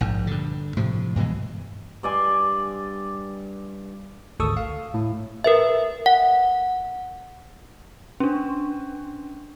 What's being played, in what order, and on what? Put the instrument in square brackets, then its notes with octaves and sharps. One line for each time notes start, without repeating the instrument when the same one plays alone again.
[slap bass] A#1 G#2
G2 D3
A2 C3 F3
G2 B2 E3 G#3
[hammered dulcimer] G2 D5 G#5 C6
[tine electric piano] G#1 D2 A4 C#6 D#6 E6
F5
A2
[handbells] A#4 B4 E5
F#5
[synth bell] C#4 D4